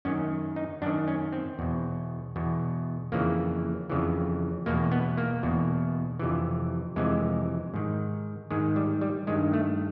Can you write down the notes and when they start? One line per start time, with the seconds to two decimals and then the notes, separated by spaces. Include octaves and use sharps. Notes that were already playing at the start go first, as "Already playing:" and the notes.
0.05 F#2 D#3 C#4
0.56 D#4
0.82 F#2 D4
0.86 D#3
1.08 C#4
1.32 C4
1.59 E2 B2
2.36 E2 B2
3.12 F2 C#3 E3 A#3
3.90 F2 C#3 E3
4.66 E2 B2 A#3
4.92 B3
5.17 A#3
5.43 E2 B2
6.19 F2 C3 E3
6.96 F2 C3 E3 G#3
7.74 G#2 D#3
8.51 G#2 D#3 G#3
8.76 G3
9.01 G3
9.27 G2 D#3 G#3
9.53 A3